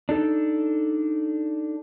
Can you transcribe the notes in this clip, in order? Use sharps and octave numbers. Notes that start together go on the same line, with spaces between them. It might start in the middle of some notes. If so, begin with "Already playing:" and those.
D4 D#4 A4